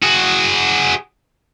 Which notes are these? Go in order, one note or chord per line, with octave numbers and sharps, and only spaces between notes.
F#4 G#4